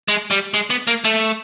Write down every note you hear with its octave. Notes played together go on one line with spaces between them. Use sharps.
G#3
G3
G#3
B3
A#3
A3